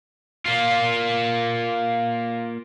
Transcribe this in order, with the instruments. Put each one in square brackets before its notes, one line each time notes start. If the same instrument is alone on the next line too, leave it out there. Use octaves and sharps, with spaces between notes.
[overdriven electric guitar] A#3 F4